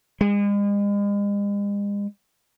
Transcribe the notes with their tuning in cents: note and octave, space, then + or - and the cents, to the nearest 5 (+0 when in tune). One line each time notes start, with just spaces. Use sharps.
G#3 -40